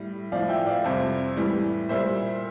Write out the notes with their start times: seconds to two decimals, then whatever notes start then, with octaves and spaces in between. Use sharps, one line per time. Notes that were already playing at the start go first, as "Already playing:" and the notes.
Already playing: A2 G3
0.32 A2 F3 D5 F5
0.49 E5 G5
0.67 D5 F5
0.84 F2 C3 G3 C5 E5
1.37 A2 E3 G3
1.89 A#2 G3 C5 E5